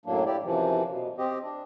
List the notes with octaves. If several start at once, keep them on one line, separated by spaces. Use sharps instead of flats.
F#2 A2 F#3 A#3 D4
E4 G4 D5
F#2 C3 E3 F3
B2
C4 G4 D#5
D4